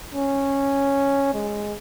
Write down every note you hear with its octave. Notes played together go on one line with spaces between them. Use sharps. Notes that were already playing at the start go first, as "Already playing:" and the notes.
C#4
G#3